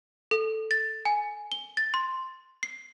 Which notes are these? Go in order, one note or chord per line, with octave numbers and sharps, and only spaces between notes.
A4
A6
G#5
G7
A6
C6
C7